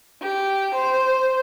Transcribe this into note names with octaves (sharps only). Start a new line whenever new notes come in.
G4
C5